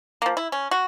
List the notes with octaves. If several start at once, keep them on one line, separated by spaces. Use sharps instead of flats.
F3 A#3
E4
C#4
F#4